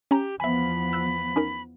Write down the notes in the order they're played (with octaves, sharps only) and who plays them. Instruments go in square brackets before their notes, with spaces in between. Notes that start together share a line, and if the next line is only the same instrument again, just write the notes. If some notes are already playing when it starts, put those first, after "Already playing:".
[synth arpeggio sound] C#4 G#5 A#5 [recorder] G4
[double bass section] E2 F3 B3 [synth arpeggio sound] E5 G#5 [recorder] B5
[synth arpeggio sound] E6 F#6
C#4 D#4 A#4